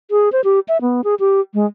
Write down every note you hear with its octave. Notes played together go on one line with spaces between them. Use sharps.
G#4
C5
G4
E5
B3
G#4
G4
G#3